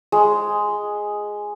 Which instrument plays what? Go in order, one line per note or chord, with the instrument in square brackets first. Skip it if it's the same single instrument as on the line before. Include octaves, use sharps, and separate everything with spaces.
[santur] G#3